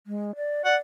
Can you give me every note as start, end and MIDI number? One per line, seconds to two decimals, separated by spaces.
0.07 0.35 56
0.36 0.62 74
0.65 0.76 74
0.65 0.76 78